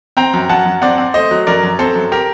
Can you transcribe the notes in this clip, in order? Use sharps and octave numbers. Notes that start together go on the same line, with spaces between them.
C4 G5 A#5
F#2
F#2 F#5 A5
F#2
C4 D5 F#5
C4
A3 C5 D#5
F#3
F#2 A#4 D5
F#2
C4 A4 C5
F#2
G4 A#4